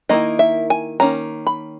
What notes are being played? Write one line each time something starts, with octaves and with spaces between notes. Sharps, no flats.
D#3 A#3 E4 D#5
E5
G#5
D#3 A#3 C#4 A#5
B5